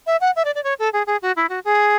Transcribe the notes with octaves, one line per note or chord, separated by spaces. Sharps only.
E5
F#5
E5
D5
D5
C#5
A4
G#4
G#4
F#4
E4
F#4
G#4